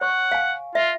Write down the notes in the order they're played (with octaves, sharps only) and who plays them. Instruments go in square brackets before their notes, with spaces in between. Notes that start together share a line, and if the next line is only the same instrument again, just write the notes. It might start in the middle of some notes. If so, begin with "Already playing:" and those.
[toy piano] C#5 C#6 [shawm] F#5
[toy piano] F5 G#5
[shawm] F4 [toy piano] E5